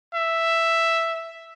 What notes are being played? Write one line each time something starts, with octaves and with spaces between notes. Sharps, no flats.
E5